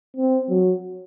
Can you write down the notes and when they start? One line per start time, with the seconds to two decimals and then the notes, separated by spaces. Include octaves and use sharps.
0.17 C4
0.50 F#3